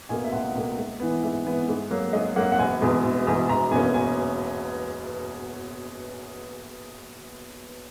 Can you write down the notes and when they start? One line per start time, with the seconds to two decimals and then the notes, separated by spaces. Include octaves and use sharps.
0.09 B2 A#3 G#5
0.24 E5
0.32 C#2 F#5
0.54 B2 A#3
0.78 G#2
1.00 E3 B3
1.23 G#2 E5
1.45 E3 B3
1.68 G#2
1.91 F#3 A#3
2.13 G#2 D#5
2.36 F#3 A#3 F#5
2.52 F#5
2.59 E1 G#5
2.81 E2 B2 G#3
3.03 E1
3.27 E2 B2 G#3
3.49 E1 A#5
3.71 E2 B2 A#3 C#4 G#5
3.94 G#5